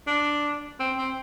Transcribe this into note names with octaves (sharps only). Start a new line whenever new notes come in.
D4
C4
C4